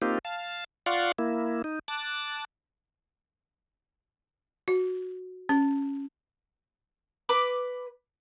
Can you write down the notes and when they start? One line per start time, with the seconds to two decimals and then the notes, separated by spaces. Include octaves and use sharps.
0.02 A#3 C4 D#4 F4 G4
0.25 F5 A5
0.86 F4 D5 F5 F#5 C6 C#6
1.19 A#3 E4
1.64 D#4
1.88 A5 D6 F#6
4.68 F#4
5.49 C#4
7.29 B4 B5 D6